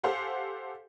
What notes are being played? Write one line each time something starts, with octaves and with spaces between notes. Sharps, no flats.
G4 A4 C5 F5 F#5 G#5